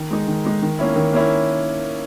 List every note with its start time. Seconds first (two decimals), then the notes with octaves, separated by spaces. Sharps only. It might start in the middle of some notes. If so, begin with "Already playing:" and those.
Already playing: D#3
0.10 G#3 D#4
0.28 D#3
0.45 G#3 D#4
0.62 D#3
0.79 A#3 C#4 E4
0.96 D#3
1.13 A#3 C#4 E4